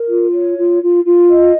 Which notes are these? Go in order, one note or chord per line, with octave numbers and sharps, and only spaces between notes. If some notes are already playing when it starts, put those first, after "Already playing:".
Already playing: A#4
F4
C#5
F4
F4
F4
D#5